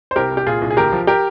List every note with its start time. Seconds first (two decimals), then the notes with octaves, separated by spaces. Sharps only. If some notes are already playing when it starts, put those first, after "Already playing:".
0.11 C5
0.16 C2 G4 A#4
0.31 C2
0.37 G4
0.47 A#2 F4 G#4
0.62 C2
0.70 G#4
0.77 D2 G4 A#4
0.92 F3
1.07 G4 A#4